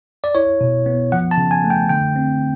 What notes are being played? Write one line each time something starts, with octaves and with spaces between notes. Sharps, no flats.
D5
E4 C#5
B2
B3
F3 F#5
A5
C#3
G#5
A3
G5
D3 G5
C4